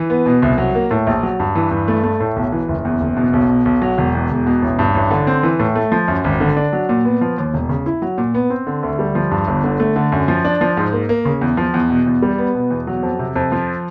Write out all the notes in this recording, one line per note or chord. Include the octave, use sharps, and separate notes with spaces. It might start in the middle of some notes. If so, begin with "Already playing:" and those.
Already playing: E3
B3
B2
C2
F#3
A#3
A2
A#1
F#3
G2
E3
G2
A3
A3
A2
B1
E3
F#1
E2
F#1
B2
B1
B2
B1
F#3
E1
E2
E1
B2
A1
G2
A1
D3
C4
E3
A2
A3
F3
F#2
G#1
D3
D4
F#3
A#2
B3
F3
D#2
E1
C#3
E4
F#3
A#2
B3
C4
D3
D2
G3
F3
G2
G1
D3
A3
D3
F#2
F3
D4
F3
G#2
A#3
A#3
C#3
E2
F3
E2
B2
E2
G3
B3
B2
E2
F#3
F2
C3
F2
F3